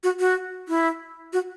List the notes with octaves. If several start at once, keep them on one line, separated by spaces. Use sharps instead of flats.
F#4
F#4
E4
F#4